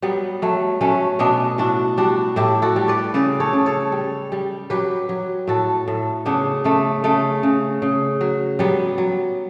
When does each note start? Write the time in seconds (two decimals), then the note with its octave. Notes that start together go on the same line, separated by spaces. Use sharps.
0.02 F#3 G3 B3
0.42 F#3 A3
0.81 F#3 A3 C#4
1.19 B2 B3 D4
1.58 A2 D4 F#4
1.97 G3 D4 F#4
2.36 A2 E4 G4
2.62 F#4 A4
2.76 G3
2.88 B4 D5
3.14 C#3 B4 D5
3.40 A4 C#5
3.53 C#3
3.66 A4 C#5
3.92 G3
4.32 G3
4.70 F#3 G4 B4
5.09 F#3
5.47 A2 F#4 A4
5.88 A2
6.26 C#3 B3 D4
6.64 C#3 A3
7.04 C#3 A3
7.43 C#3
7.82 C#3
8.21 F#3
8.59 F#3 G3 B3
8.98 F#3